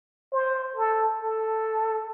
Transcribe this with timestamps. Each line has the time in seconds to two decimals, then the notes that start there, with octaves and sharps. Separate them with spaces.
0.33 C5
0.76 A4
1.19 A4